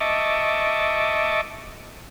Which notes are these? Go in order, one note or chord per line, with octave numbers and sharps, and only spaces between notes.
D#5 E5 A5 C#6 D6